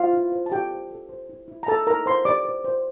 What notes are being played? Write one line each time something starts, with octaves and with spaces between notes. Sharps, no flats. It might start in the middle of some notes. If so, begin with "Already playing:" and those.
Already playing: F4 C5 F5
E4
C5
A5
G4 A4 G5
C5
A4
C5
E4
E4
A#5
E4 A4 A5
E4 A#4 A#5
E4 C5 C6
G4 D5 D6
C5
C5